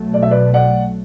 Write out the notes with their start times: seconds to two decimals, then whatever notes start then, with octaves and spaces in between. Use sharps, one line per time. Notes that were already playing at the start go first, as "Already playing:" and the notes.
Already playing: B1 B2 F#3 A3
0.14 D5
0.22 E5
0.31 B4 D5
0.54 D5 F#5